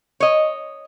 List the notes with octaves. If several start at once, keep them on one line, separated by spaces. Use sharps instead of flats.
C#5 D#5